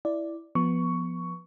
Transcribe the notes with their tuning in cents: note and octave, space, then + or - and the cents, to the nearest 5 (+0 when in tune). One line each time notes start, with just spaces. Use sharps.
E4 +0 D5 +0
F3 +0 B3 -10 C#6 +10